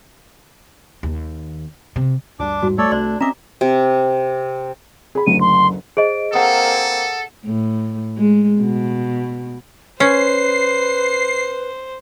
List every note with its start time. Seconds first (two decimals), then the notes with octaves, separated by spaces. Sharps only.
1.03 D#2
1.96 C3
2.40 D2 G2 D4 D6
2.62 A1 E2 G#2 G3 F#4
2.78 A3 A4 C#5 D5
2.91 C2 D4 C5 D5 C6
3.21 C4 C#4 D#5 E5 A#5 D6
3.61 C3
5.15 G#4 B5
5.26 F#1 D2 D#7
5.41 C6
5.97 G#4 C5 D#5 D7
6.33 A#3 C4 A4 F#5 D#6
7.46 A2
8.17 G#3
8.61 B2
10.00 C#4 B4 C5 C7